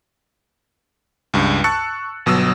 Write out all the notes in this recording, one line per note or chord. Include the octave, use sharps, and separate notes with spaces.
C#2 G2
A5 C#6 E6 F#6 A6 C#7
G1 B2 F#3 D#6 E6